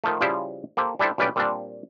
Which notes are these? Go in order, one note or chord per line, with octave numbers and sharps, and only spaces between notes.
D#3 F3 A3
C#3 F3 G3 E4 G4 C5
A#3 G4 A4 C5
G3 D4 E4 G4 A4 C5
B1 G3 C#4 B4 D5 G5
A#2 G3 C4 D4